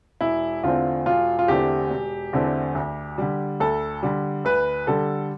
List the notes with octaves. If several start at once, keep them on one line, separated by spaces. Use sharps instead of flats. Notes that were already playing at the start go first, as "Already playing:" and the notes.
E1 E4
E2 D3 A3 C4 F4
E1 F4
F4
E2 D3 A3 C4 G4
E1
E2 D3 A3 C4
D2
D3 G3
D2 A4
D3 G3
D2 B4
D3 G3 A4